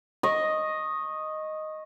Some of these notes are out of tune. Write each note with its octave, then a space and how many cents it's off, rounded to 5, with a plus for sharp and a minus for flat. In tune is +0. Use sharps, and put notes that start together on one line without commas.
D#5 +0 C#6 -20